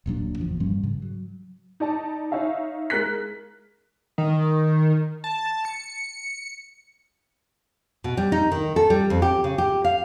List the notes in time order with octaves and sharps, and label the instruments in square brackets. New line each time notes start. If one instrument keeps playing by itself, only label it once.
[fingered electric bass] D#1 A#2 F#3 D4
F#1 E2 A#2 F3
G2 F3 G3 C#4
G#2 C#3
F#3
[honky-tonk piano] D#4 D5 A5
D#4 C#5 E5 F5
G#3 A#4 F#6 B6
[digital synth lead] D#3
A5
C#7
[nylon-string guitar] B2
G3
D#4
D#3
A4
G3
F2
G4
C#3
G4
F5